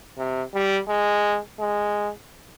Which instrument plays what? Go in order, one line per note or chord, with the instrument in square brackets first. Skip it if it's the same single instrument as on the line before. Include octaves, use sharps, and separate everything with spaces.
[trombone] C3
G3
G#3
G#3